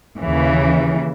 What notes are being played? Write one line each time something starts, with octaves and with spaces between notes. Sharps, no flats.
D#2 C#3 E3